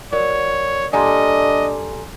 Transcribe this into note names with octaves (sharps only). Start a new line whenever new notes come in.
F#3 A#4 C#5 D5
A#2 G3 D4 A4 D#5 G#5 A#5 C6